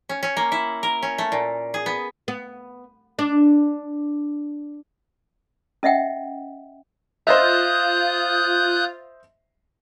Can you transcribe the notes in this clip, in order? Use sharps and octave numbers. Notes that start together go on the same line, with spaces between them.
C#4
C#4
A#3
E4
A#4
C#4
A3
A#2
G#4
B3
B3
D4
C#4 D#5 E5 F#5 G5
F4 C5 D#5 E5 D#6 F#6 G6